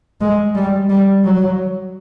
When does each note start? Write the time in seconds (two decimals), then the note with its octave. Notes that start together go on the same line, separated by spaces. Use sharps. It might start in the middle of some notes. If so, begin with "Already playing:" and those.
0.21 G#3
0.55 G3
0.89 G3
1.24 F#3